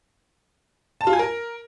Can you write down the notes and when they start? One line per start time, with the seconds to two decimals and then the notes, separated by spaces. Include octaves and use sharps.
1.01 A5
1.07 F4
1.13 G#5
1.19 A#4